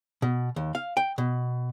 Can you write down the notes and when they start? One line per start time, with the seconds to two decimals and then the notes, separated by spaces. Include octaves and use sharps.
0.22 B2
0.56 D#2
0.75 F5
0.97 G5
1.18 B2